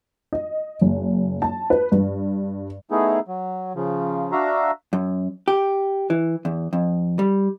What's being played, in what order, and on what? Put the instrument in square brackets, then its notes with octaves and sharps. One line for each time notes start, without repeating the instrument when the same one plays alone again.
[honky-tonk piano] D#5
F#1
A5
B4
G2
[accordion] A3 B3 D#4 E4 G#4
F#3
C#3 F3
D4 F#4 E5 F5 A#5
[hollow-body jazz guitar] F#2
G4
E3
E2
F2
G3